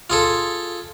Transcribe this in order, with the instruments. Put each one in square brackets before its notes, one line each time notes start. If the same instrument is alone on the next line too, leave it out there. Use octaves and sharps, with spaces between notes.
[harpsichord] F4 G#4 A4